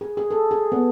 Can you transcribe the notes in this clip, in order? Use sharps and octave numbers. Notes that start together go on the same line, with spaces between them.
G#4
G#4
A4
G#4
B3